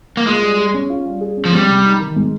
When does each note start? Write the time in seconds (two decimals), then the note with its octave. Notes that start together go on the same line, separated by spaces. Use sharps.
0.17 A#3
0.27 G#3 F4
0.42 G3
0.58 G#4
0.74 C#4
0.90 F4
1.06 G3
1.21 G#4
1.37 C#4
1.45 F3
1.53 G3 G#3
1.69 C3
1.84 D#4
2.00 D#3
2.16 G#3